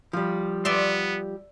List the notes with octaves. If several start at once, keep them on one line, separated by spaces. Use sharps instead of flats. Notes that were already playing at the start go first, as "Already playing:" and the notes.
F3 G3
B3 D5 E5 C6